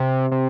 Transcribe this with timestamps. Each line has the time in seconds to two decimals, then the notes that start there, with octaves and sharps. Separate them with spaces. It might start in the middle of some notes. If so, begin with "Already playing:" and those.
Already playing: C3
0.32 C3